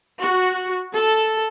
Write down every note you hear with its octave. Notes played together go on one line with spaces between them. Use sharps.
F#4
A4